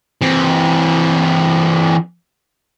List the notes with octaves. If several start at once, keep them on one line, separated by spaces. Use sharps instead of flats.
E3 C4